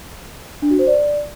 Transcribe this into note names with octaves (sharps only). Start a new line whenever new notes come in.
D4
F#4
C5
D5